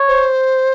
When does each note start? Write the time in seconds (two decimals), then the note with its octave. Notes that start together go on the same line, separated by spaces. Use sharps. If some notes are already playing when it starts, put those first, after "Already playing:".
Already playing: C#5
0.08 C5